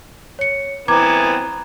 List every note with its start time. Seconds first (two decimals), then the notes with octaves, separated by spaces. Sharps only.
0.39 C#5 C#7
0.88 E3 B3 C4 A#5 D6 G#6